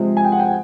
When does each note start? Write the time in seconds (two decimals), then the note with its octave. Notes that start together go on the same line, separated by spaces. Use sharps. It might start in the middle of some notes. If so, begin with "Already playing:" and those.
Already playing: C3 F3 G#3
0.17 G#5
0.24 G5
0.32 F#5
0.40 G5